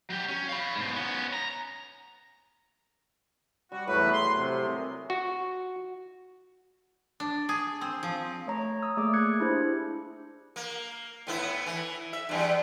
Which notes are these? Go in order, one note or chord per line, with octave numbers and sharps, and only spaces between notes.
F#3 G4
C#4
F5 B5
G#2 B2
B3 C#4
A#5
G3 F#4
E2 A2 F#3 A3 B4
C6
C3
G#4 A#4 D5
F#4
D4
G#4
C4
F3
A3 C#5 A#5
D#6 E6
A3 A#3 G#4 D5 D6
F#6 G#6 C#7
D4 E4 G4 G#4 C5
A#3
A2 B3 E4
E3
E5
E2 G2